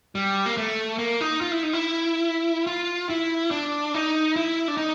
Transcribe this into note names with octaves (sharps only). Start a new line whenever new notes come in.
G3
A#3
A3
A#3
D#4
F4
E4
D#4
E4
F4
E4
D4
D#4
E4
D4
D#4